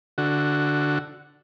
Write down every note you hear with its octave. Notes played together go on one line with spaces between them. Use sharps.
D3 F#4